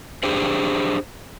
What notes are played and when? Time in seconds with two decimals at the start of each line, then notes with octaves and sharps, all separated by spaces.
0.23 D4 G4 G#4 C5